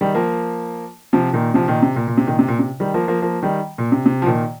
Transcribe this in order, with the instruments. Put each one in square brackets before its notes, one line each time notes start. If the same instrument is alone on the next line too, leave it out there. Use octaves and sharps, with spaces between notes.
[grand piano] D#3 G3
F3 A#3
C3 F3
A#2 D#3
C3 F3
A#2 D#3
C3
A#2
A#2
C3
A#2 D#3
C3
A#2
C3
D#3 G3
F3 A#3
F3 A#3
F3 A#3
D#3 G3
A#2
C3
C3
F3
A#2 D#3